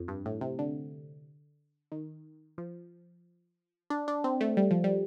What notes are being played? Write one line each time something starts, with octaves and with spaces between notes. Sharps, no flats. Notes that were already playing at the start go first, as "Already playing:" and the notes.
Already playing: F2
G2
A2
C3
D3
D#3
F3
D4
D4
C4
A3
G3
F3
G3